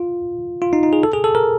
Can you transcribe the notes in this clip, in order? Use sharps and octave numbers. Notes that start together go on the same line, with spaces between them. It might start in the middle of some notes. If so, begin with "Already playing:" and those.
Already playing: F4
F4
D#4
D#4
G#4
A4
G#4
A4
A#4